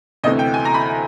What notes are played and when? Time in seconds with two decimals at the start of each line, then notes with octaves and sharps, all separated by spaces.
0.24 D2 C3 E3 A3 D#5
0.39 G5
0.54 G#5
0.65 A#5
0.74 B5